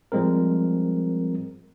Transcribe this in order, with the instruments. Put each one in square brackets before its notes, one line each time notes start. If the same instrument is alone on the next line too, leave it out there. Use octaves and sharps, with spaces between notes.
[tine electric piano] F3 G3 G#3 C4 A#4